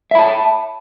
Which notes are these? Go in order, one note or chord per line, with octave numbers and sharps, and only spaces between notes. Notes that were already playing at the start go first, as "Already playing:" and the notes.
E5 A5 B5